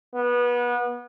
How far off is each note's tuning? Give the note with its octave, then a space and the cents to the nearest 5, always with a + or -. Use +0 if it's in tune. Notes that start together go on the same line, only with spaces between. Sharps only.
B3 -25